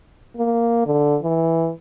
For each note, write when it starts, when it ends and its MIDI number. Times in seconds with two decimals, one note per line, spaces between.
0.37 0.81 58
0.86 1.16 50
1.22 1.70 52